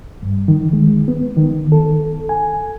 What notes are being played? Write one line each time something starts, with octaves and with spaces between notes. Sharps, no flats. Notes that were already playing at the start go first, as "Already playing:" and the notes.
G2
D#3
G#3
B3
D#3
A4
G#5